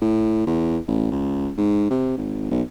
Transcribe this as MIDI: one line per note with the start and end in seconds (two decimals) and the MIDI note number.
0.01 0.43 45
0.47 0.78 40
0.87 1.07 33
1.11 1.50 37
1.57 1.90 44
1.90 2.14 48
2.17 2.48 32
2.51 2.62 35